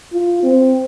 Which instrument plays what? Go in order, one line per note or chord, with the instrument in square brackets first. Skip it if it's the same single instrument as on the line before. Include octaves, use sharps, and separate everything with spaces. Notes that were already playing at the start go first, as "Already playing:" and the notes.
[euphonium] F4
C4